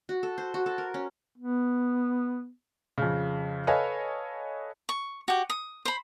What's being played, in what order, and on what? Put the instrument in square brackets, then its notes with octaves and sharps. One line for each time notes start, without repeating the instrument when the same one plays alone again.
[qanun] F#4
A4
C5
F#4
A4
A#4
C#4
[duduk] B3
[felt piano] F2 C#3
A4 B4 C#5 D#5 F5 G#5
[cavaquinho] C#6
F#4 G4
D#6
C5 B5